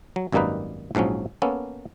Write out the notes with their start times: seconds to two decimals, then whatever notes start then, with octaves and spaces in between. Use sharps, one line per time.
0.16 F#3
0.32 G#1 F#2 G3 A#3 D#4 B4
0.95 A#1 G#2 F3 F#3 C#4
1.42 A#3 B3 C#4 A4